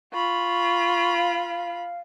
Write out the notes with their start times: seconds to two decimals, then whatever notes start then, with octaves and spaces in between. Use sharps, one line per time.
0.13 F4 B5 C#6
1.17 F5